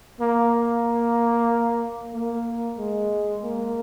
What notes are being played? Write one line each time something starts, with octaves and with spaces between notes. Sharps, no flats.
A#3
A#3
G#3
A#3